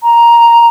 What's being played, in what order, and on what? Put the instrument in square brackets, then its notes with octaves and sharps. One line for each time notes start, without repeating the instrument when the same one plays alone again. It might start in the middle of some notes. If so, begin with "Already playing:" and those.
[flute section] A#5